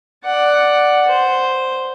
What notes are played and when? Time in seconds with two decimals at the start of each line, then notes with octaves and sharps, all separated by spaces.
0.25 D5 F#5
1.08 C5